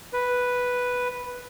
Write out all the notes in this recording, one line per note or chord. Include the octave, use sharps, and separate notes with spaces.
B4